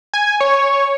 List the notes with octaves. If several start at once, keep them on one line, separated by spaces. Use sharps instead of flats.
G#5
C#5